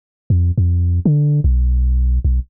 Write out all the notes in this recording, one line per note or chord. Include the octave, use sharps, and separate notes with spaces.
F2
F2
D3
B1
B1